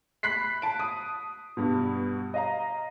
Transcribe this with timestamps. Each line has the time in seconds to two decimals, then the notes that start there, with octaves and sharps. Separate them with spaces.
0.23 B5 F#6 B6 C7
0.62 A5 D7
0.80 D#6
1.57 G2 B2
2.34 D#5 F5 A#5